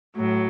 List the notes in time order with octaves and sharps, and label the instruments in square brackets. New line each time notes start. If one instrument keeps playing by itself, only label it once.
[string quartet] A2 F#3